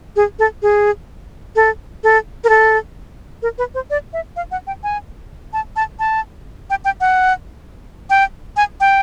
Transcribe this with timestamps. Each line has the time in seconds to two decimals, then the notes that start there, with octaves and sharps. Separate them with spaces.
0.16 G#4
0.39 A4
0.62 G#4
1.56 A4
2.04 A4
2.44 A#4
2.49 A4
3.42 A#4
3.58 B4
3.75 C5
3.90 D5
4.13 E5
4.36 F5
4.51 F#5
4.67 G5
4.83 G#5
5.53 A5
5.76 A5
5.99 A5
6.70 G5
6.85 G5
7.01 F#5
8.10 G5
8.57 G#5
8.80 G5